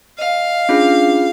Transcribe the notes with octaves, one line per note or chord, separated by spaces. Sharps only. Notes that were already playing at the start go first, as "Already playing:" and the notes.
D#5 F5
C#4 D4 F4 G#4